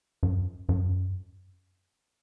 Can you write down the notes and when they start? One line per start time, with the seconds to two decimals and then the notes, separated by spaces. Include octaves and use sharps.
0.23 F#2
0.69 F#2